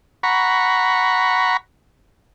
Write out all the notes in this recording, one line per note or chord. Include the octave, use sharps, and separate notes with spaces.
F#5 A#5 B5 C#6